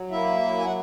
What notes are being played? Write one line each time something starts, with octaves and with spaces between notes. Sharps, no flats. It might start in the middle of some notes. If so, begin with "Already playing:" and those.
Already playing: F#3
A#3 E4 E5
F#3
G#5
F#5